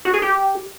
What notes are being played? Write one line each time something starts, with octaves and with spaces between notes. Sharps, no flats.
F#4
G#4
G4